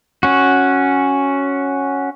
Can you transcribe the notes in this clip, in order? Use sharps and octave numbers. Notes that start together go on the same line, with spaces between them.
C#4 F#4